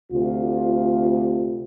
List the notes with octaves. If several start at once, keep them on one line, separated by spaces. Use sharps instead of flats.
D2 C3 F4